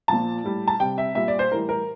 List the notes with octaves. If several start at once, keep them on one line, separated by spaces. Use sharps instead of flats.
A#2 F3 A5
A2 G3
A5
C3 G3 G5
E5
A#2 G3 E5
D5
C5
A2 E3 G3 A#4
A#4